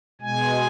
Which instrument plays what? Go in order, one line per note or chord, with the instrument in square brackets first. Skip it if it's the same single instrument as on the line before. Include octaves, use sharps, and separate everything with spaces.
[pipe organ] B2 G#3 G#5